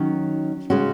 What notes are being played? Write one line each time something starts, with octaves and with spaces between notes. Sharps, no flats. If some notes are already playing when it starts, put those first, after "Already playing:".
Already playing: D#3 F#3 C#4
C#3 G#3 C#4 F#4